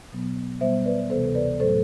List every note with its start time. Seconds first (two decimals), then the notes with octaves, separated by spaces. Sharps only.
0.12 B2 F#3 B3
0.61 B2 G3 B3 C5 E5
0.85 B4 D5
1.10 D2 C3 E3 B3 A4 C5
1.35 B4 D5
1.60 A2 F#3 A3 A4 C5